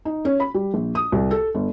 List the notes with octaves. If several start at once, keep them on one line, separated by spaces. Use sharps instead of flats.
D#4
C#4
B5
G3
A#1
D#6
C2
A4
G1